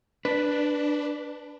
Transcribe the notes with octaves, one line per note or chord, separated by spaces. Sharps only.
D4 B4